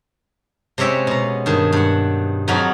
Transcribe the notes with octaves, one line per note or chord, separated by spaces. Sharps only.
C3 G#3 C#4 E5 G5
B2 A#5
G2 D#3 G#4
G2 F#5
F2 F#3 D#4 F4 F#4 B5